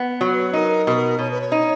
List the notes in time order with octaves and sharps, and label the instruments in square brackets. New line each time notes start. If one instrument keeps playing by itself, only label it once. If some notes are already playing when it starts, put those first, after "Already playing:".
Already playing: [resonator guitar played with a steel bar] B3
F#3
[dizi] B4
[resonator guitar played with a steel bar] D#4 [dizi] A#4
[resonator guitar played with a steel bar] B2 [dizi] A#4
[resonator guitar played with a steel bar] B2 [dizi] C#5
[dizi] B4
C#5
[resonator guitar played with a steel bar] D#4